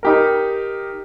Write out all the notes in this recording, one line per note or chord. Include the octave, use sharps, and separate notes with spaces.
D#4 G4 A#4